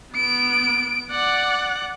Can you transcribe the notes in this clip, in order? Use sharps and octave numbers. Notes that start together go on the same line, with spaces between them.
B3 D7
D5 F#5